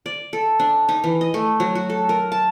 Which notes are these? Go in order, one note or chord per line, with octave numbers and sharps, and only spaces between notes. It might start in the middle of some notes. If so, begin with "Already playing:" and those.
D5
A4
D4
D#4
E3
D#5
A3
F#3
F#4
A4
A#4
A5